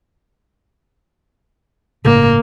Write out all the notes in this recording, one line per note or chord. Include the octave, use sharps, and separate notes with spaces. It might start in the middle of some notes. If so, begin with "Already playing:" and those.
G1 A2 C#3 A#3